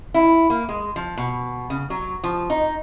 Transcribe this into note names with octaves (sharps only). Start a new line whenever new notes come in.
E4
A#3
G#3
F3
B2
C#3
F#3
F3
D#4